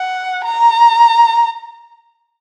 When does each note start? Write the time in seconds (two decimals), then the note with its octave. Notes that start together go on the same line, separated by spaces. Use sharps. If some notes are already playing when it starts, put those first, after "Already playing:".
Already playing: F#5
0.45 A#5